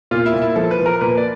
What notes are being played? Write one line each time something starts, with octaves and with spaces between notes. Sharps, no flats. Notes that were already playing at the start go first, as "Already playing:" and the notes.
A#2 F4
E4
A#2
E4
F3 A4
B4
F3
A#4
A#2 B4
D5